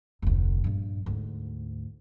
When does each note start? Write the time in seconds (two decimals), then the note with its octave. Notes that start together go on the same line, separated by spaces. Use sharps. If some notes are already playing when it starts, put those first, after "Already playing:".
0.22 F1 D2
0.64 A#1 G2
1.06 D2 G#2